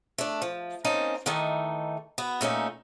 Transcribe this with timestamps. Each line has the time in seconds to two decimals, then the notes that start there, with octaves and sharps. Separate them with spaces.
0.18 A3 D4
0.42 F3
0.84 A#3 C4 C#4 D#4 A5
1.26 D#3 E3 A3 D#4
2.18 B3 F#4
2.41 A#2 A3 C#4 D#4